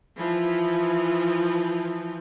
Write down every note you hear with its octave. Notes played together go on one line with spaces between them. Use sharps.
E3 F3